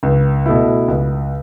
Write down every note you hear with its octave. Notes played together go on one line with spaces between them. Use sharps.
C#2
B2 A3 E4
C#2